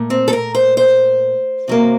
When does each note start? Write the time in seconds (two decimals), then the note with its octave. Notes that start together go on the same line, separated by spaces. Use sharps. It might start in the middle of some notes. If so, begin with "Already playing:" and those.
Already playing: A#2 A3
0.10 C4
0.28 A4
0.33 A#4
0.55 C5
0.77 C5
1.68 C3 F#3 A#3